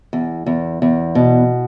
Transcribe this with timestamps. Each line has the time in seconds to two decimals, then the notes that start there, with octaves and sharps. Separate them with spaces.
0.13 E2
0.46 E2
0.82 E2
1.15 B2